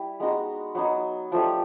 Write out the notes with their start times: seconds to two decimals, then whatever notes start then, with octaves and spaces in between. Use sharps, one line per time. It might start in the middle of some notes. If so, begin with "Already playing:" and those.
Already playing: G3 E4
0.20 G#3 B3 D#4 F#4
0.75 F#3 B3 D#4
1.32 F3 A3 D4 G4